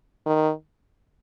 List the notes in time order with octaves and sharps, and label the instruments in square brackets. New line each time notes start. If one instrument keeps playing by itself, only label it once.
[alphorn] D#3